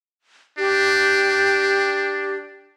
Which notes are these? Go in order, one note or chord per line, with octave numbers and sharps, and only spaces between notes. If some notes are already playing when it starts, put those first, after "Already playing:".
D4 G4